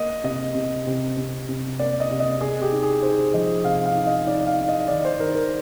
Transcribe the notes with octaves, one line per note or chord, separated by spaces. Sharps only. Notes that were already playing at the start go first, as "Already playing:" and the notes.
Already playing: A#3 D#5
C3 D#5
C3
C3
C3
C3
A#3 D5
D#5
C3
D#5
C3 G#4
G4
D#4
G#4
D#4 C5
F3 D#5
C3 F5
F5
D#4
D#5
D#4 D5
F5
D#4
D#5
D#3 D5
C5
D#3 A#4
A#4